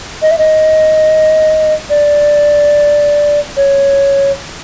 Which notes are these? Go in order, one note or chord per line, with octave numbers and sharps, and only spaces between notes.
D#5
E5
D#5
D5
C#5